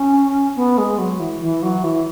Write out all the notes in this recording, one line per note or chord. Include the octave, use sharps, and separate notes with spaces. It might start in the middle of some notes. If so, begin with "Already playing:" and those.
Already playing: C#4
B3
G#3
F#3
E3
E3
F#3
E3